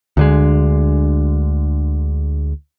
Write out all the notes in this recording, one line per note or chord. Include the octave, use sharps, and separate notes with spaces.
D2 D3 G#3